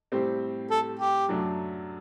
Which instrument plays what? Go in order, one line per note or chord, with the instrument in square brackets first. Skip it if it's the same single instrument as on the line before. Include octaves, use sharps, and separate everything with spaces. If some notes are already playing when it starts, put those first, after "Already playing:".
[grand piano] A2 G3 C4 G4 C5
[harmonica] A4
G4
[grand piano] F#2 F#3 A3 D4